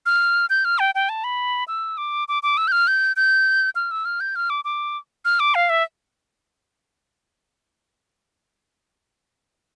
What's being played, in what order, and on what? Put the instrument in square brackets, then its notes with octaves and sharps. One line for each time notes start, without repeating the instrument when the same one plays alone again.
[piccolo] F6
G6
F6
G5
G5
A5
B5
E6
D6
D6
D6
E6
G6
F6
G6
G6
F6
E6
F6
G6
F6
D6
D6
F6
D6
F5
E5